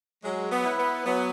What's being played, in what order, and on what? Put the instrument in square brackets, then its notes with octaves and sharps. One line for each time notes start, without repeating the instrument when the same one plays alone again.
[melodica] F#3 [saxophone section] G#3
[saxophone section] B3
[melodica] E4 B4
[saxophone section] B3
[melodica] F#3 [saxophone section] B3